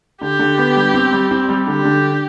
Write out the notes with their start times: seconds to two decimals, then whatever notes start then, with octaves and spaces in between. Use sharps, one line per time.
0.21 D3 G4
0.39 D3
0.58 B3
0.76 G3
0.94 C4
1.13 G3
1.31 C4
1.49 G3
1.67 D3 G4
1.85 D3